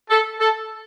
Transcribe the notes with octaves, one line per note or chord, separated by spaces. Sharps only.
A4
A4